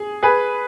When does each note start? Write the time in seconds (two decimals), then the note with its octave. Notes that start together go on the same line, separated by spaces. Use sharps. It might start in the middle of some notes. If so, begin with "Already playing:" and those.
Already playing: G#4
0.23 G#4 B4